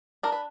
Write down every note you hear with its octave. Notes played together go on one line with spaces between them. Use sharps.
D4 A#4
B4